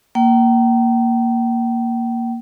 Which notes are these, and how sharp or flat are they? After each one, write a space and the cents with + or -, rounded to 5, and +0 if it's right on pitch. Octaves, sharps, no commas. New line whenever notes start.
A#3 +0 G5 -35